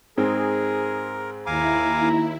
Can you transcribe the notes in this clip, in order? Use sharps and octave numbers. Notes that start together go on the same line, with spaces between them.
G#2 G#3 C4 G#4 A#4
D#2 E4 F5 G#5 A#5 D6